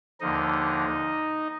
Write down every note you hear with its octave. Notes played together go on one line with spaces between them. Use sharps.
D#2 D3 F3 D#4 D#5